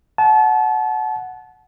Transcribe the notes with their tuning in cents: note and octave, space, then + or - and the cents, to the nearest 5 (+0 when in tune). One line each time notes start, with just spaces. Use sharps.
F#5 +0 A5 -30